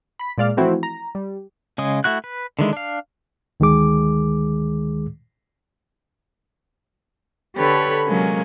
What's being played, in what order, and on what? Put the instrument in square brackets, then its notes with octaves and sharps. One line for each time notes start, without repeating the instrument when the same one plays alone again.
[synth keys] B5 B6
A#2 G#3 D5 F5 F6
E3 F3 A3 C4 E4 F#4
A#5
G3
[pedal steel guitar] C#3 G#3 D#6
A3 E4 F#4 F#6
B4
D3 D#3 G#3 E4
D4 F5
[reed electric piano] D2 D#3 G#3 G#4 D6
[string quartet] D3 G4 A4 B4 C#5 B5
C3 F#3 G#3 A#3 C#4